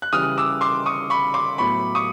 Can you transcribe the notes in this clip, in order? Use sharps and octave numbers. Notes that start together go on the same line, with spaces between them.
F#6
C#3 E3 G3 D#6 F6
D6 E6
C6 D6
C#6 D#6
B5 C#6
C6 D6
A2 F#3 B3 B5 C#6
C#6 D#6